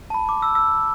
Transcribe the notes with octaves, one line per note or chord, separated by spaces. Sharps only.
A5
B5
D6
E6
E6